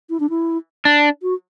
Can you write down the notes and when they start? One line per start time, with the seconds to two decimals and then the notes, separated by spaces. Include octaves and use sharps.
0.10 E4
0.20 D4
0.30 E4
0.85 D4
1.22 F#4